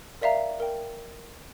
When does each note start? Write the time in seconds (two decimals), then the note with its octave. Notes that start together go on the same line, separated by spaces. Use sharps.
0.21 A#4 D5 E5 F5 A#5
0.60 A#4 G5